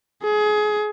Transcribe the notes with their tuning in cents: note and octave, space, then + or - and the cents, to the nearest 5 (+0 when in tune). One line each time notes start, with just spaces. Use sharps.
G#4 +25